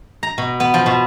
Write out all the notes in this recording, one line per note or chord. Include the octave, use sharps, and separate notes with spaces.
A#5
B2
B3
F3
B2